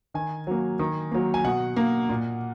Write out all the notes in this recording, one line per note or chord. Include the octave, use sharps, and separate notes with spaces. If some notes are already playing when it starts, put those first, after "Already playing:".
D#3 G#5
F#3 A#3
D#3
F#3 A#3
G#5
B2 F#5
A#3
A#2